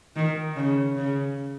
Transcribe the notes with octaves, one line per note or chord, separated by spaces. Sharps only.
D#3
C#3
C#3